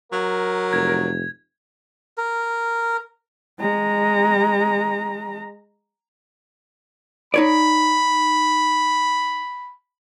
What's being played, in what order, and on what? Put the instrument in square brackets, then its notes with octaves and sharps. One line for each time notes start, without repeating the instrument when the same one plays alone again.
[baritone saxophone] F#3 [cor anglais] A#4
[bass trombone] F1 [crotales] G#6
[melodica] A#4
[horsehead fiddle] G#3 A#5
[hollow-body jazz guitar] D#4 C#5 D5 [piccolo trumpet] B5